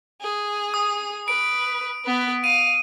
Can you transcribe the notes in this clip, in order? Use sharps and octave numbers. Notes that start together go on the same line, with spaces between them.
G#4
D#6
B4 D7
B3 B4
F5 D#7